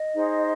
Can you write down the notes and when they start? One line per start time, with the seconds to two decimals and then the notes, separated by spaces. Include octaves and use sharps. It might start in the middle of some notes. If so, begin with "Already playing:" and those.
Already playing: D#5
0.14 D#4 G#4 C5